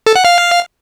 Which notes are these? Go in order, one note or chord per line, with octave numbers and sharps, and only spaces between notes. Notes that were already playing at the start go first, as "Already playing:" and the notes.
A4
F#5
F5